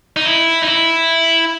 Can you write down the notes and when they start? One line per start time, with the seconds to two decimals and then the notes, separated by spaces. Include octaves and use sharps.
0.16 D#4
0.25 E4
0.62 D#4
0.68 E4